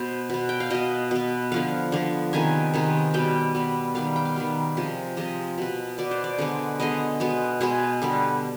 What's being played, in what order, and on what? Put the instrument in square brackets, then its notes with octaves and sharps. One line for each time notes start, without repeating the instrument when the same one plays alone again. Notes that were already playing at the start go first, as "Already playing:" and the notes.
Already playing: [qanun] B2 B3 C5
B2 B3
G5
F5
B2 B3 D#5
B2 B3
D3 F3 B3 F5
D3 F3 B3
C3 D#3 G#3 B3 G#5
C3 D#3 G#3 B3
B2 G3 B3 G5
B2 G3 B3
D#3 G3 B3 F5
G5
F5
D#3 G3 B3
C3 F3 G#3
C3 F3 G#3 D#5
B2 B3
B2 B3 D5
C5
D5
D3 G#3 B3
D3 G#3 B3 D#5
B2 G#3 B3
B2 G#3 B3 G#4
D3 G3 B3